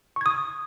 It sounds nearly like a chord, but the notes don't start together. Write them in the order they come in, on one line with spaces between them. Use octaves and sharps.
C#6 G#6 D#6